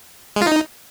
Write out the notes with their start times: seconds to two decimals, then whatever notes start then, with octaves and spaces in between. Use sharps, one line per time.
0.36 G#3
0.42 F4
0.47 D#4